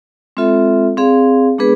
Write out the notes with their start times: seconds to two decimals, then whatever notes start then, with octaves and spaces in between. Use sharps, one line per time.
0.37 G#3 C4 F4 A4 E5
0.97 C4 G#4 D5 F5
1.58 G#3 B3 D4 G#4 B4